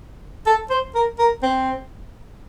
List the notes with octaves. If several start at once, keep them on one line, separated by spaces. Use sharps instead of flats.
A4
C5
A#4
A#4
C4